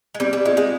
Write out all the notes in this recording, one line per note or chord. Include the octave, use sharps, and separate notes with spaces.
G#3
G3 C4
G3
G#3 F4
G#3